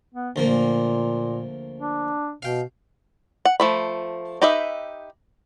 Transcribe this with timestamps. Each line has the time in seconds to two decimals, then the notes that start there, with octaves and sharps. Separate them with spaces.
0.14 B3
0.36 D2 A#2 F3 A#3
1.78 D4
2.42 B2 F5 G5
3.45 F#5
3.60 F3 A3 B5
4.42 D#4 G4 B4 D#5 E5